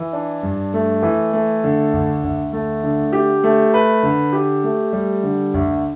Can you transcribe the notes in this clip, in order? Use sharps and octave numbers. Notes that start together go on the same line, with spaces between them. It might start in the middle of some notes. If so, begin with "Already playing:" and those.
Already playing: E3
D4
G2
A3
E3
A3
D3
D2
D2
A3
D3
G4
A3
B4
D3
G4
A3
G3
D3
D2